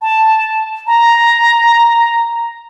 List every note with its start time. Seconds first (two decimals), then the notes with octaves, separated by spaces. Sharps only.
0.02 A5
0.87 A#5